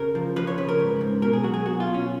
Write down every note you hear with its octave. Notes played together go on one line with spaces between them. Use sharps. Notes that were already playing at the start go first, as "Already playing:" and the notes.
Already playing: C#3 A#4
F3
F3 B4
C#5
C#3 B4
A#4
G#2
G#2
B2 A#4
G#4
F#3 F#4
G#4
B2 F#4
F4
B2
C#4